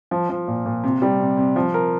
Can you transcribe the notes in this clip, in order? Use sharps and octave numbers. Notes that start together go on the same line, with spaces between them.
F3
F3
A#2
A#2
C3
G3
C3
C3
F3
A#4